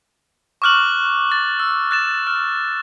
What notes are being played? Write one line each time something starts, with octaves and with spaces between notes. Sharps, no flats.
C#6 D6 F6 F#6 F#7
A6
E6
F#6 A6 E7
F6